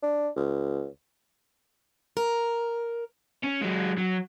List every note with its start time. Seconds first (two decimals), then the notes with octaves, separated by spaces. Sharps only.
0.03 D4
0.36 C#2
2.17 A#4
3.43 C#4
3.61 F#3 G#3
3.98 F#3